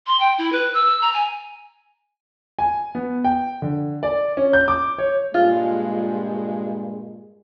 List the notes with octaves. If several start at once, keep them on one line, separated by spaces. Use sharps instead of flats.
C6
G5
E4
B4
E6
A#5
G#5
G#5
B3
G5
D3
D5
C#4
G6
D6
C#5
G2 A#2 G#3 F4